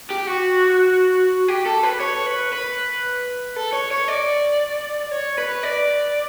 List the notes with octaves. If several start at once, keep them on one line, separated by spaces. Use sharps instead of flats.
G4
F#4
G4
A4
B4
C#5
B4
B4
A4
C#5
C#5
D5
C#5
B4
D5